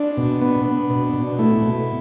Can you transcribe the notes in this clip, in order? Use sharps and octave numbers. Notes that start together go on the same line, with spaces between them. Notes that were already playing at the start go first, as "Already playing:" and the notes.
Already playing: D4
B2
B3
B3
B2
B2
A3 E4
B2